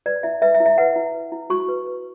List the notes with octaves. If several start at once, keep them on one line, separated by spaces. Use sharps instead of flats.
B4 D5
E4 E5
B4 E5
E5
E4
E5
B4 F#5
E4
B4
E4
F#4 C#6
B4
B4